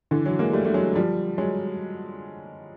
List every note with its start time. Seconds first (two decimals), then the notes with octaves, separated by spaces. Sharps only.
0.11 D3 E3
0.25 E3 F#3
0.39 G#3 A#3
0.53 G3 A3
0.65 A3
0.74 F#3 G#3
0.96 F3 G3
1.38 F#3 G#3